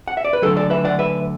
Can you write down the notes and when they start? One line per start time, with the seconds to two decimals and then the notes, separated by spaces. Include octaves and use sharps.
0.08 F#5
0.17 E5
0.25 D5
0.33 B4
0.42 D2 D3 F#3 A4
0.57 A4 D5
0.70 B4 E5
0.85 D5 F#5
0.99 B4 E5